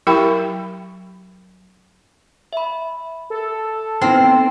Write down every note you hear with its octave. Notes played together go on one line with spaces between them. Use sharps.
F#3 E4 G4 A#4 G5 B5
E5 B5
A4
B3 C4 D#4 E4